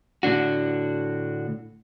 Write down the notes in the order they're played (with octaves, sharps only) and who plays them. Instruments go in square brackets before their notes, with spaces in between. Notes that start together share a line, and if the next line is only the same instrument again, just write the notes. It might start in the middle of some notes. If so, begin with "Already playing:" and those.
[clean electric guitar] A2 D3 D4 F#4